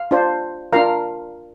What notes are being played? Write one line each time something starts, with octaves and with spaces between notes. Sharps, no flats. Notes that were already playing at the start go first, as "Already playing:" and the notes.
Already playing: F5
D4 F4 C5
D4 F4 A#4 F5 A#5